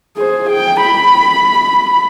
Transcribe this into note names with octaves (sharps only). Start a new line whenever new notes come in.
G#4 C5
G5
B5